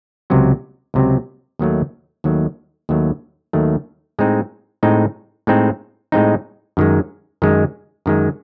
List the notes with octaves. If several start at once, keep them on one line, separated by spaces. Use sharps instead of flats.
C#2 C3 F#3 C4
C#2 C3 F#3 C4
D#2 D#3 F#3 A3
D#2 D#3 F#3 A3
D#2 D#3 F#3 A3
D#2 D#3 F#3 A3
A2 G#3 C4 D#4
A2 G#3 C4 D#4
A2 G#3 C4 D#4
A2 G#3 C4 D#4
F#2 D#3 G#3
F#2 D#3 G#3
F#2 D#3 G#3